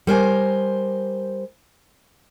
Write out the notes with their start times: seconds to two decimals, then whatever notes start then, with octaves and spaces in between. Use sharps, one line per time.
0.07 G3 A#4 C5 G#5